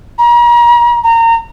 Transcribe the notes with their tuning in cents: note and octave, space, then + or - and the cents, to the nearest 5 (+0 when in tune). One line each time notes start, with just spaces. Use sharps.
A#5 +40
A#5 -25